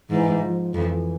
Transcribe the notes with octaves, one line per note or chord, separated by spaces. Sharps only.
G#2 E3
F3
F2 E3